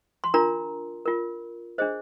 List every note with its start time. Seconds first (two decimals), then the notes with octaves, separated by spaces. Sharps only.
0.24 C6
0.34 D4 F4 A#4 A#5
1.06 F4 A#4
1.78 D4 G#4 C5 D#5